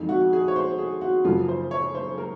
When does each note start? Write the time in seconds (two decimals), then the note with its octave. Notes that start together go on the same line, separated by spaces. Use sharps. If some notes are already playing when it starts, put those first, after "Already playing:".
Already playing: F2 D#3 G#3
0.09 F#4
0.33 G#4
0.48 C#5
0.56 C5
0.79 G#4
1.01 F#4
1.24 F#2 C#3 F3 A#3 F4
1.48 C5
1.71 C#5
1.95 C5
2.18 A#4